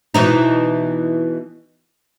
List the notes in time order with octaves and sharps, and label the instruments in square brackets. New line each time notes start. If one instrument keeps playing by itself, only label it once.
[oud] B2 E3 D#4